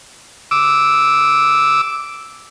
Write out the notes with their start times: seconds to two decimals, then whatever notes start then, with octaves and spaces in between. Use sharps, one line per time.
0.51 D6 E6